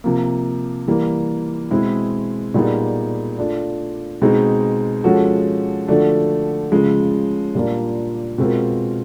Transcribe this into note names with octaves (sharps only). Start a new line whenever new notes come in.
C3 F3 A#3
E3 G3 A#3
B2 G#3 C4 E4 G#4
A#2 G3 B3 D#4 G#4
A3 D4 F4
B2 G#3 C4 D#4 G#4
F3 G#3 C#4 F#4 A4
D3 F3 A3 D4 F#4
C#3 F3 G#3
A#2 G3 A#3 D4 F4
B2 G#3 C4 F4 A#4